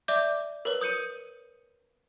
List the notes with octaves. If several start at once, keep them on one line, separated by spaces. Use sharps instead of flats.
D5 E5 D6 G6
A#4 B4 C#5
D#6 G6 C#7 D#7